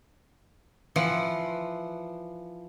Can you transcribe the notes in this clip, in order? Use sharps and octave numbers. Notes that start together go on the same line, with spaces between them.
E3 F3 F#5